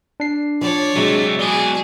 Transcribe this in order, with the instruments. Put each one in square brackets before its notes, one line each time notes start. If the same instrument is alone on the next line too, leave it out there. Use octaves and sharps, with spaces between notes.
[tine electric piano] D4 C7
[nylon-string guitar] F3 [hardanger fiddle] C#5 D5
[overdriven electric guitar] C3 A3 [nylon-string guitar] F#3 G#3
[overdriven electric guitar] B2 E3 [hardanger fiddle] G#4 [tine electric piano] D5